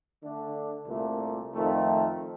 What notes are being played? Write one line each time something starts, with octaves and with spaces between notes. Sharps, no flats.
D3 A3 D4
C2 A#2 A3
F2 D#3 A3 C4 F4